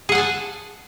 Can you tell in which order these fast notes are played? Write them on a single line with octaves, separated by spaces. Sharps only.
G#4 F#5 G#5 A5